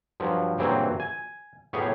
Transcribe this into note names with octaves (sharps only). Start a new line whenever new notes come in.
G2 F3 F#3
G2 A#2 C#3 E3 F#3 C4
G#5
A2 F#3 B3 G4 G#4 C#5